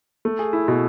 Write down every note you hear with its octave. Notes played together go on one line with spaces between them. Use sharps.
A3
G#4
E4
B2